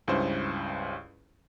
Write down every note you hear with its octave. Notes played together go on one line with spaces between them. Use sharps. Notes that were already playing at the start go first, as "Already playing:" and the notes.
C#2 G2 C#4 E4 C5